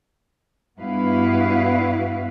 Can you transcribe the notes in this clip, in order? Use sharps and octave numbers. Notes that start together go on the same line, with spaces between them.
G2 B3 E4 F#4 B4 F5